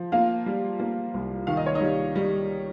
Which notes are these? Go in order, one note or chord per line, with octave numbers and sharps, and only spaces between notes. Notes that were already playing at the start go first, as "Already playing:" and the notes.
Already playing: F3
A#3 F4 F5
G3
A#3
C2
D#3 F5
D#5
C#5
D#4 D#5
G3
G3